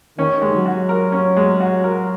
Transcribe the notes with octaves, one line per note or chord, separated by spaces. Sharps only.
D#3 C#4
G#3
F#3
F#4
A#4
C#4
G#3
F#4
A#4